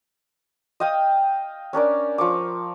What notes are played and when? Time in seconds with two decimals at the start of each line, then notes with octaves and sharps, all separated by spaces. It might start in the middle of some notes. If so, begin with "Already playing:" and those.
0.80 D#5 F5 G5 D#6
1.73 C#4 D4 A#4 D5
2.18 F3 C#6 D6